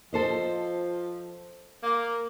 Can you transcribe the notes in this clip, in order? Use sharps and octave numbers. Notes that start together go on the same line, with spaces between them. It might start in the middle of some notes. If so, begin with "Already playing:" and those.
F3 A4 C5 D#5
A#3